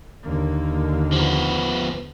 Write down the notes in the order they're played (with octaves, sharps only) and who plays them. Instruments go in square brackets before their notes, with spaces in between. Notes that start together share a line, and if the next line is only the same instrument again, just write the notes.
[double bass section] D#2 D3 A#3
[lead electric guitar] F3 B3